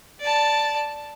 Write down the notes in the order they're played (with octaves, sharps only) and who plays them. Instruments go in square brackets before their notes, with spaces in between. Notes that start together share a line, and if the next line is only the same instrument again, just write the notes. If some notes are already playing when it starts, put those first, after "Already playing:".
[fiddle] D5 A5